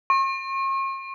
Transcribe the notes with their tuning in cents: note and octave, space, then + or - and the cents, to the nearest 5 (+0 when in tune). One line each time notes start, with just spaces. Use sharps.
C#6 -45